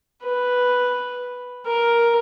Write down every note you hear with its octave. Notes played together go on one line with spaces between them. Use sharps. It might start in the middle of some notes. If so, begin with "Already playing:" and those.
B4
A#4